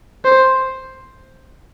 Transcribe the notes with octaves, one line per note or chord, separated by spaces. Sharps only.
C5